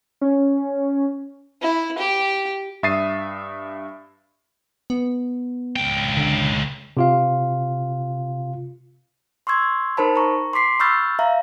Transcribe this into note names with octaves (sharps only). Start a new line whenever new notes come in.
C#4
E4
G4
G2 E5 D#6 A6 C7 D#7
B3
C#2 G5
D3
C3 F4 F5
C6 C#6 E6 G#6
D#4 A#4 C5 A5 B5
A#5 C#6
C6 D6 B6 C7
B5 C#6 E6 F6 G6 A6
E5 F5 A#5